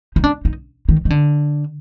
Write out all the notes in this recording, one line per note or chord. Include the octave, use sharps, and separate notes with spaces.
D#4
D4
D#4
D#3
D#3
D3